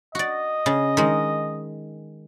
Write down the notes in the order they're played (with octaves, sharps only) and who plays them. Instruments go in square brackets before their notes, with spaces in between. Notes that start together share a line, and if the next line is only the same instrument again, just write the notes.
[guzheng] F#4 D5 [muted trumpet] D#5
[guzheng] C#3
D#3 G#3